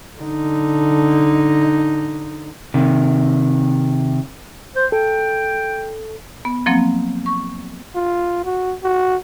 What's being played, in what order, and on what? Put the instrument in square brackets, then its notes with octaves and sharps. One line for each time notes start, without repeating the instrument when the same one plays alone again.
[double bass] D3 D#4
[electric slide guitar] C3 D#3
[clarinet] C5
[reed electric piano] A4 [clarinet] G5
[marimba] B3
F3 F#3 A#3 C4
C#6
[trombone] F4
F#4
F#4